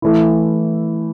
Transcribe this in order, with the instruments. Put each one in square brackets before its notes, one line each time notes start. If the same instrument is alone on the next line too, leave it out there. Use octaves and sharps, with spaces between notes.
[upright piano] E3 A3 E4